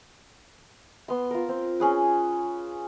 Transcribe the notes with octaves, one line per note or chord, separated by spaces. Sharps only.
B3 C6
F4 A#4
C4
C#4 G#4 B4